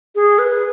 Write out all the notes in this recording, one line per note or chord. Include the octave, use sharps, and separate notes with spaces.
G#4
B4